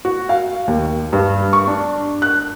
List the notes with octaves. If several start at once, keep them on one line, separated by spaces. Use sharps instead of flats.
F#4
F5
D#2
G2
C#6
D4
F#6